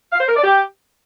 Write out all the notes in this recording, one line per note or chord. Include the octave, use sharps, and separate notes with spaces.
F5
C5
A#4
D5
G4